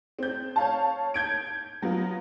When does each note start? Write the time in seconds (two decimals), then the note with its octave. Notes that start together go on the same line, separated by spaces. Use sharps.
0.19 C4 G6
0.56 C#5 F5 A5
1.14 G6 G#6 D7
1.82 F#3 B3 F4